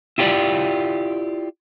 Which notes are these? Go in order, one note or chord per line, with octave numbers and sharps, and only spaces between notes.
E4 F4 G4 B4 D5